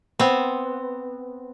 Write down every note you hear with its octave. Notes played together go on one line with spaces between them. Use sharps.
B3 C4